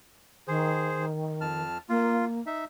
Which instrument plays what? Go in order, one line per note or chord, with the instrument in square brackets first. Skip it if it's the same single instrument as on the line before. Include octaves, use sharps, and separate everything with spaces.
[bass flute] D#3 [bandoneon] G#4 C5
[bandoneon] F2 A5 F6
[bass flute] A#3 [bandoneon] F4
[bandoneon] D#4 E5